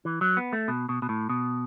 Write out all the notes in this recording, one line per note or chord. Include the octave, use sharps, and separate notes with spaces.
E3
F#3
B3
A3
B2
B2
B2
A2
B2